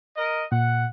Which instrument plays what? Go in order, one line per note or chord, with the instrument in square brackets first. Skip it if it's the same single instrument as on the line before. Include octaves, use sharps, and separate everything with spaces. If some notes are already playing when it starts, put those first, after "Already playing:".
[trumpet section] A#4 D#5
[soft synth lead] A#2 [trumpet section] F#5